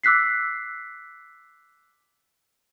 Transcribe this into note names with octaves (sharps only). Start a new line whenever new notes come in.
D6 E6 F#6 B6 C7